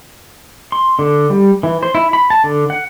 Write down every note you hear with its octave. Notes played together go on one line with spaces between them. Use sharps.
C6
D3
G3
E3
C5
E4
B5
A5
D3
F#5